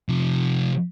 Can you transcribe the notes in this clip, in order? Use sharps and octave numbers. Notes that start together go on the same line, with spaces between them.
C3 F3